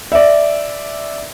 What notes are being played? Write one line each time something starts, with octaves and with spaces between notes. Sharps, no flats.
D5 E5